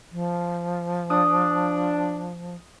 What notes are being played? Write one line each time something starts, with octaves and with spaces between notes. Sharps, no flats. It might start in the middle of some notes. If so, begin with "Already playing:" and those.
F3
D4 D#6